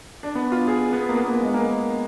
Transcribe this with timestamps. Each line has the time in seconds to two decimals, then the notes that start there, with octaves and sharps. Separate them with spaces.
0.23 D4
0.35 B3
0.52 F4
0.68 G#4
0.93 B3
1.09 A#3
1.17 B3
1.29 A#3
1.42 G#3
1.54 A#3